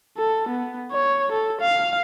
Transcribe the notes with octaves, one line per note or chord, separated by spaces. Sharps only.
A4
B3
C#5
A4
F5